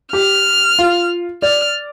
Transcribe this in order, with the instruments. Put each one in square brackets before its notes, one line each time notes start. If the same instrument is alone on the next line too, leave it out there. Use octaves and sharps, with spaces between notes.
[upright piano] G4 [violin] F6
[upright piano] F4
[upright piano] D5 [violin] F6